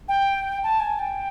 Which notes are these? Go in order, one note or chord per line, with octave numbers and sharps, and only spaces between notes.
G5
A5
G#5
G5